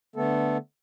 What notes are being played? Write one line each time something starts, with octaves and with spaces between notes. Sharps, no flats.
D3 A3 B3 A4